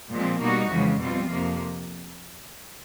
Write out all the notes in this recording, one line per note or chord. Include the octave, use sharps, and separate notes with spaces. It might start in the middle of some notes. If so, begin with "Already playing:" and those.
A#2 F3 G#3 C4
B2 G3 A#3 D#4 F#4
F2 C#3 E3 G#3
B2 G3 C4 F4
F2 C3 F3 A#3